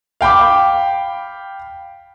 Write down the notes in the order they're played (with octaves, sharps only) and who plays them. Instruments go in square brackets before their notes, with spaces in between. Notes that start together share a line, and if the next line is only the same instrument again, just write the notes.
[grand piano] F5 G5 B5 D6